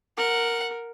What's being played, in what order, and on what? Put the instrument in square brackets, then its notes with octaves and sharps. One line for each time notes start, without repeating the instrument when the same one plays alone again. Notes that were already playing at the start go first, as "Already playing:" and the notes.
[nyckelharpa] A#4 [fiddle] F#5